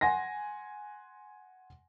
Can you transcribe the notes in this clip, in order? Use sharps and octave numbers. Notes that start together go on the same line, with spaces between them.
F#5 G#5 C6 A#6